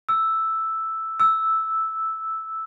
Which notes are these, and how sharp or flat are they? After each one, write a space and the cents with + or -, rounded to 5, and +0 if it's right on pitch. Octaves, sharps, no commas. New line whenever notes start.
E6 +0
E6 -5